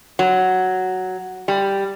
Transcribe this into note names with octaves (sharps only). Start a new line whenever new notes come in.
F#3
G3